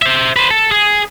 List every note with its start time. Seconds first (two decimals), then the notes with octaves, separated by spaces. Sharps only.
0.02 C5 E5
0.36 B4 C5
0.51 A4
0.71 G#4